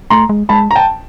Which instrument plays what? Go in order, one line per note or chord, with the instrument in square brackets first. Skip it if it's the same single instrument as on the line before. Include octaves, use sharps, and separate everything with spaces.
[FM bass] A3 [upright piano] A#5 C6
[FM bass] G#3
[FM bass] G#3 [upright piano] A5 B5
[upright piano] A#5
G5 A5